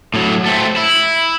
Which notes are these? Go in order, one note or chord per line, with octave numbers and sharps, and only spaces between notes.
A2 F#3
A3 C4
E4